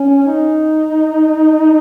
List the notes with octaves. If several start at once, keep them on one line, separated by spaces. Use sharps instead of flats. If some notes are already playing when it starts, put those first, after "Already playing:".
Already playing: C#4
D#4